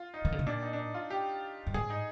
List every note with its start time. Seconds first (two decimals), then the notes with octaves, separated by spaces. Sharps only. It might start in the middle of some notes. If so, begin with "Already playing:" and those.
Already playing: F4
0.14 D#4
0.25 D#3
0.32 D3
0.39 C3
0.46 A#2 D4
0.63 D#4
0.73 D4
0.78 D#4
0.94 F4
1.10 G4
1.67 G2
1.74 G#2 G#4
1.90 D#4